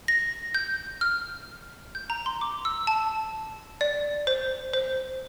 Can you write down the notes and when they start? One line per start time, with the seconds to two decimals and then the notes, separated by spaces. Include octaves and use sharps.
0.08 A#6
0.55 G6
1.01 F6
1.95 G6
2.10 A#5
2.26 C6
2.41 D6
2.65 E6
2.87 A5
3.81 D5
4.27 C5
4.73 C5